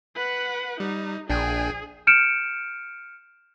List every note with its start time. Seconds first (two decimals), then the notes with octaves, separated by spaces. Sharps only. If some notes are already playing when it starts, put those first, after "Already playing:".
0.15 B4 F#5
0.80 G3 D#4
1.29 A#1 D4 G#4 G5 G#5
2.07 F6 G6 C#7 D7 E7